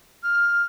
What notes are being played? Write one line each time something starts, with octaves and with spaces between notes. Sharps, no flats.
F6